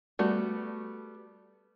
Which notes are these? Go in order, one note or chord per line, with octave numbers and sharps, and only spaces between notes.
G3 A3 B3 F#4